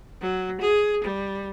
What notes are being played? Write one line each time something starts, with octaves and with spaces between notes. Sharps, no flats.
F#3
G#4
G3